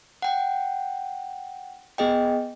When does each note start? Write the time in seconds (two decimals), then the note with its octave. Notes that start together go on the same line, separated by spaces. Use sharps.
0.22 F#5 G5
1.98 B3 G#4 D#5 G5